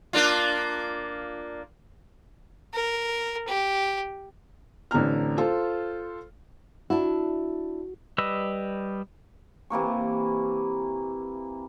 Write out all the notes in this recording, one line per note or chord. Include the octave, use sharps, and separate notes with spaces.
A#3 D4 F4
A#4
G4
A1 D3 C4 A#5 F6
F4 A4 C5
D4 E4 F#4
G3 B4 D#5 E6
C3 E3 A#3 C#6